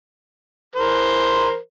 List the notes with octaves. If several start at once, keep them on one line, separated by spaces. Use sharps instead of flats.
E3 A#4 C5